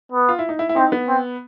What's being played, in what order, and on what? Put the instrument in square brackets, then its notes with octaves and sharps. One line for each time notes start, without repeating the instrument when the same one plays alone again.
[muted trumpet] B3
[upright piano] F4
E4
D#4
E4
E4
[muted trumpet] C4 [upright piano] D#4
[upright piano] B3
[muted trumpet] C4